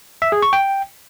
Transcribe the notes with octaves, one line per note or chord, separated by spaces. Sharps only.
E5
G#4
C#6
G5